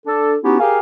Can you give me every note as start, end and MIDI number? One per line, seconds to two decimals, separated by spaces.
0.07 0.35 62
0.07 0.35 69
0.43 0.57 59
0.43 0.57 61
0.43 0.57 63
0.43 0.57 64
0.43 0.57 66
0.43 0.57 67
0.60 0.80 67
0.60 0.80 68
0.60 0.80 70
0.60 0.80 77